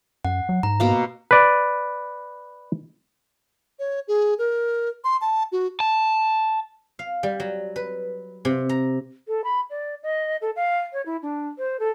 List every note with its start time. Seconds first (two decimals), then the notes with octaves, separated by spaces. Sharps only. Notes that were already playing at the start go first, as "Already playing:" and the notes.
0.25 F#2 F#5
0.49 F#3
0.63 G#2 A#5
0.80 B2 A#3 F5
1.31 B4 D5
3.79 C#5
4.08 G#4
4.38 A#4
5.04 C6
5.21 A5
5.52 F#4
5.80 A5
6.99 F5
7.23 G3
7.40 F#3
7.76 B4
8.45 C3
8.69 A#5
9.28 A4
9.44 B5
9.70 D5
10.03 D#5
10.42 A4
10.56 F5
10.93 C#5
11.06 E4
11.22 D4
11.58 C5
11.80 A4